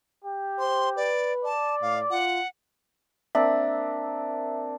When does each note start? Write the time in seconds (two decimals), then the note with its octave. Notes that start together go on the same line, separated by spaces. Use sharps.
0.24 G4
0.59 C5 C6
0.97 B4 D5
1.45 D5 A5
1.82 A2 F5
2.11 F4 F#5
3.35 A#3 C4 D4 E5